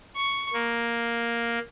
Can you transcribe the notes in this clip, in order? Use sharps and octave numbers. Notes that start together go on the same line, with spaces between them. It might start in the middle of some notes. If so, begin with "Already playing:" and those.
C#6
A#3